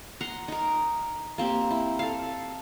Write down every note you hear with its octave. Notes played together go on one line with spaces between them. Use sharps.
F#5 A#5 C6
D#4 A#4
A#3 C4 G4
E4
A4 F5